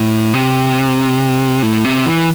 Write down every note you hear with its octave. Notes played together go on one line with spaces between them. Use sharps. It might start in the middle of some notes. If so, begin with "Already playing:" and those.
Already playing: A2
C3
A2
C3
E3